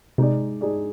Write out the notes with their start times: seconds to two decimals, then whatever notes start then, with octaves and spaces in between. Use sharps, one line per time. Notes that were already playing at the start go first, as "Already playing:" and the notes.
0.18 C3 G#3 D#4 G#4 D5
0.61 G#3 D#4 G#4 D5